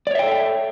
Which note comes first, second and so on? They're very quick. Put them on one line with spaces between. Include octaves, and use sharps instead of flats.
D5 C#5 E5 G5 A4